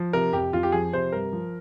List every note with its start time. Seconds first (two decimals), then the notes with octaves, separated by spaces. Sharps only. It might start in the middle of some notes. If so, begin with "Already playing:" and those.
Already playing: F3
0.13 C3 A#4
0.33 F2 G4
0.52 F2 F4
0.63 G4
0.72 F3 G#4
0.93 C3 C5
1.12 G2 A#4
1.33 F3